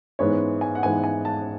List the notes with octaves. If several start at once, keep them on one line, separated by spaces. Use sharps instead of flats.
G#2 E3 G#3 B3 C#5
G#5
F#5
G#2 E3 G#3 B3 G#5
G#5
A5